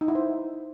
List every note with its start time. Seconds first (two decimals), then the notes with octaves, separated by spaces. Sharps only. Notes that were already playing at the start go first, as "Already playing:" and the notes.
0.01 D#4
0.08 E4
0.15 C5